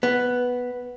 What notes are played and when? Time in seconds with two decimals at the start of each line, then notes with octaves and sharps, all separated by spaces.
0.03 B3